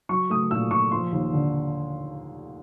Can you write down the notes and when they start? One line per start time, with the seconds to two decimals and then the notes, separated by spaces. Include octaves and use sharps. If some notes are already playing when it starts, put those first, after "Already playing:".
0.09 F#3 C#6
0.30 A3 D#6
0.51 A#2 E6
0.71 A#2 C#6
0.91 F3 C6
1.12 D#2
1.33 D3